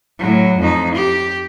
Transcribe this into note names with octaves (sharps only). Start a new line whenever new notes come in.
A2 F#3
F2 D#4
G4